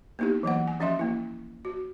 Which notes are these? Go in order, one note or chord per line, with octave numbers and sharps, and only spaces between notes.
A#3 B3 D#4 E4 G4
E3 F#3 A#3 F#5
G#5
F3 C#4 D#5 E5 C6
A#3 E4
F#4